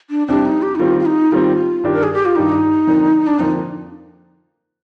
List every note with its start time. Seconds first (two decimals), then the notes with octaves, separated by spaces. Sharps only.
0.10 D4
0.27 F2 C3 G3 D4
0.45 D#4
0.62 G4
0.75 D#4
0.79 D#3 G3 C4 F4
1.00 F4
1.06 D#4
1.32 D#3 G3 C4 F4
1.83 G2 D#3 G3 D4 G4
1.93 A#4
2.03 G#4
2.14 G4
2.25 F4
2.36 G2 D#3 G3 D4 D#4 G4
2.87 F2 D3 F3 A#3 D4
3.27 D4
3.39 F2 D3 F3 A#3 D4 D#4